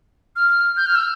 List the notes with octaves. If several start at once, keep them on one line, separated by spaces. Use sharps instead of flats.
F6
G6
F6
E6